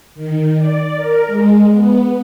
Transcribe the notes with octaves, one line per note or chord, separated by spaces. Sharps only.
D#3
D5
A#4
G#3
B3